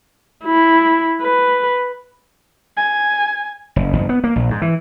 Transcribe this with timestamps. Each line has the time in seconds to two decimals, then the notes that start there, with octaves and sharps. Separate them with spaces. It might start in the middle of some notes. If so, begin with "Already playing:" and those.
0.44 E4
1.21 B4
2.77 G#5
3.76 F#1
3.93 F#1
4.09 B3
4.24 A#3
4.36 A#1
4.50 G#2
4.62 E3